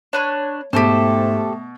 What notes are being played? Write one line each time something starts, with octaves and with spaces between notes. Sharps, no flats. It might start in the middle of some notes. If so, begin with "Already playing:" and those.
D4 B4 C#5 C#6
G#2 B2 A3 G4 A4 C5